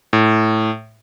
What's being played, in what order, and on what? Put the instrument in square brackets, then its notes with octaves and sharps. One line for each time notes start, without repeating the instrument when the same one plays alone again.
[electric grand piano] A2